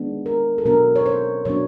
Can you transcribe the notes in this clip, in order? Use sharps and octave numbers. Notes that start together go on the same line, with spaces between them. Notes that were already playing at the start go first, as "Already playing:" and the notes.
Already playing: D#3 G#3 B3 D4
A#4
A4
B2 F#3 B3 D4 A#4
C#5
C5
B2 F#3 B3 D4 C#5